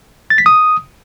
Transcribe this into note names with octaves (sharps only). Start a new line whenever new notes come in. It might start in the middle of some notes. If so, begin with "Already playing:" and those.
A6
B6
D#6